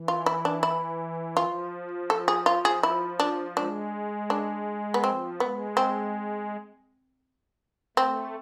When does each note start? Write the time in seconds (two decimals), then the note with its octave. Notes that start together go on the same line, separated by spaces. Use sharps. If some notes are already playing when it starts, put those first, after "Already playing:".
Already playing: E3
0.08 F4
0.26 E4
0.45 D4
0.63 E4
1.36 F3 F4
2.10 A4
2.28 G#4
2.46 F4
2.65 G#4
2.83 E4
3.20 D4
3.56 G#3 D4
4.30 D4
4.94 B3
5.04 F3 C4
5.40 G#3 B3
5.77 C4
7.97 A3 C4